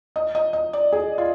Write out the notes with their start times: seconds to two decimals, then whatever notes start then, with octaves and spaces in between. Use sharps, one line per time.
0.16 D#5
0.35 D#5
0.53 D#5
0.73 D5
0.92 G#4
1.18 F4